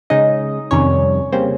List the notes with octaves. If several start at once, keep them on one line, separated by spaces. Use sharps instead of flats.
C#3 G#3 C#4 D#4 D#5
F2 C3 D#3 G3 C#4 C#5
C#3 G3 A#3 C4 C#4 C5